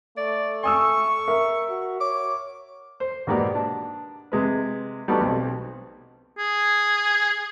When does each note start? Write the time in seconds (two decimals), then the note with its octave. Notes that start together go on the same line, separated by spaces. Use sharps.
0.17 A3 D5
0.64 G#5 C#6 D#6 E6
1.28 A#4 E5
1.69 F#4
2.00 C#5 D6
3.00 C5
3.27 G#2 B2 A#3 B3 G4 D5
3.55 D4
4.32 C3 G#3 B4
5.08 G3 A3 B3 D4 D#4 F#4
5.21 B1 C4
6.38 G#4